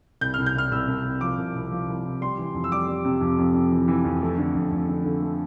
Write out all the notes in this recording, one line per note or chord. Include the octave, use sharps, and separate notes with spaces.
C2 G6
C2 F6
G6
C2 F6
C2 E6
C2
C2
F3 D6
C2
C2
F3
C2
C2
G3 C6
E3
F2
E6
G3 D6
G3
C3
F2
F2
F2
E3
E3
F2
A3
D3
F2
F2
D3
D3
A3